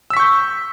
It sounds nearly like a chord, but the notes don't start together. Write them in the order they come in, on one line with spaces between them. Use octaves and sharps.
E6 B6 C#6 G6